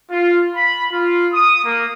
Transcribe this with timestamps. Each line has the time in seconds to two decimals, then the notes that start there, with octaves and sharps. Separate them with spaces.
0.10 F4
0.56 B5
0.91 F4
1.33 D#6
1.65 A#3